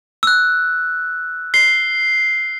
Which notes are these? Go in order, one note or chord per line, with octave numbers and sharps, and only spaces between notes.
E6 F#6
C7 G7